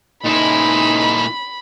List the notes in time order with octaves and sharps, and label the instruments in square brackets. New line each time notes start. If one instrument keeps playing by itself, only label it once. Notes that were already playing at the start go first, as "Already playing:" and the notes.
[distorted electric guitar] A#2 E4 [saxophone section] C#3 C4 D#4 [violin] B5